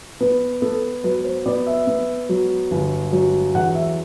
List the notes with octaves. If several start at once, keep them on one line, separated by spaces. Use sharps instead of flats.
B3 B4
B3 A4
F#3 B4
C5
B3 D5
E5
B3
F#3
G1
F#3
E2 F#5
E5